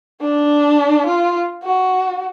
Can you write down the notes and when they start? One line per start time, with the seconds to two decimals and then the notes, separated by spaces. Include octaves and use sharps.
0.21 D4
1.06 F4
1.63 F#4